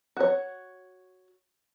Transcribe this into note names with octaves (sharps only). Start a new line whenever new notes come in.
F#4 C#5